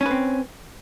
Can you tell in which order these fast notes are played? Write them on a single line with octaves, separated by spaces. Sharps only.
C#4 B4 C4